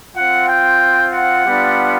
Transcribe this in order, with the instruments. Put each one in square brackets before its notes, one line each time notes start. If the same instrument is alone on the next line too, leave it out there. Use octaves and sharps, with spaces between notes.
[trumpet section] C4 F4 F#5
G5
F#5
G3 B3 D4 F4